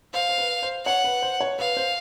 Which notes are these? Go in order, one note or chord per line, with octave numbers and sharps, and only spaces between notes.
C5 F5
C5
B4
C5
C#5 F#5
B4
C5
C#5
B4 F5
C5